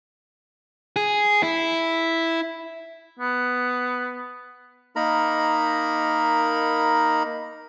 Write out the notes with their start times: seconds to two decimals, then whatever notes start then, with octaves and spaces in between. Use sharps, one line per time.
0.96 G#4
1.43 E4
3.19 B3
4.96 A#3 D#4 A#4 A#5 B5